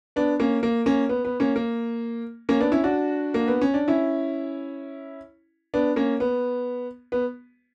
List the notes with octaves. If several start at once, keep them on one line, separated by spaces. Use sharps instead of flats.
B3 D4
A#3 C#4
A#3
A#3 C#4
B3
B3
A#3 C#4
A#3
A#3 C#4
B3 D4
C#4 E4
D4 F#4
A#3
B3
C#4
D4
C#4 E4
B3 D4
A#3 C#4
B3
B3